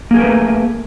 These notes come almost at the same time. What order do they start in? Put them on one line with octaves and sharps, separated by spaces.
A#3 G#4 A#4 B4 A3